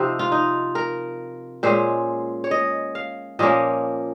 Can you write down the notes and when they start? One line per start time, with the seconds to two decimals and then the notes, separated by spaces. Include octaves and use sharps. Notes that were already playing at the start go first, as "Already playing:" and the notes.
Already playing: C3 F3 C4 D#4
0.19 F4
0.32 D#4
0.75 A#4
1.63 A#2 G#3 C#4 C5
2.44 C#5
2.51 D#5
2.95 F5
3.39 A#2 F3 A#3 C#4 D#5